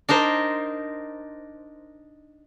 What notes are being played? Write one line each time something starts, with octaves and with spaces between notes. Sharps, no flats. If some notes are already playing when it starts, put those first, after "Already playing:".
D4 D#4 A#4 C5